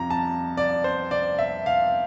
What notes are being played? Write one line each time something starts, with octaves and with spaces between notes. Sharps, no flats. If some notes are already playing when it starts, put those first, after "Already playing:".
Already playing: F2 C3 F3 A#5
A5
D5
C5
D5
E5
F5